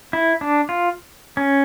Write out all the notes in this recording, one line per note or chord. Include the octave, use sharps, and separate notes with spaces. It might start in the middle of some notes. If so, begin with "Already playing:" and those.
E4
D4
F4
C#4